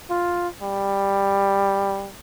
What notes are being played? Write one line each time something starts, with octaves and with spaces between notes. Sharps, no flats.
F4
G3